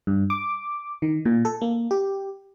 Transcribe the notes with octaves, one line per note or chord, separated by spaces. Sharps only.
G2
D6
D#3
A#2
A4
A#3
G4